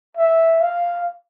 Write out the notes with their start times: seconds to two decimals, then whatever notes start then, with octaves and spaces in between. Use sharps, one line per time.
0.17 E5
0.61 F5